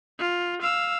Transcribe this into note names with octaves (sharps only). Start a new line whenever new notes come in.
F4
F5 E6